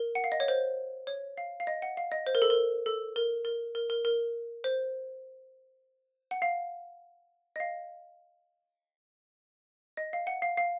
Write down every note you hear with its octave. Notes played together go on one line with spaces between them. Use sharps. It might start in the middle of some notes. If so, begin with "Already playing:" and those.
Already playing: A#4
F#5
F5
D#5
C#5
C5
C#5
F5
F5
D#5
F#5
F5
D#5
C5
A#4
A4
A#4
A4
A#4
A#4
A#4
A#4
A#4
C5
F#5
F5
D#5
F5
D#5
F5
F#5
F5
F5